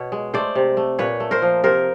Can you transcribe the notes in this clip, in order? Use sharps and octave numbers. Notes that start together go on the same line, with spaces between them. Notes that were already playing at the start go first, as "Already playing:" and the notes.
Already playing: B2 B4 C#5
G#3
A3 C5 D5
C3
A3
A#2 B4 C#5
A3
A#4 C5
F3
C3 A#4 C5